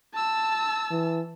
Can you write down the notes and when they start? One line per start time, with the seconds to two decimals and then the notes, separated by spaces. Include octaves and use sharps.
0.13 A5 E6
0.91 E3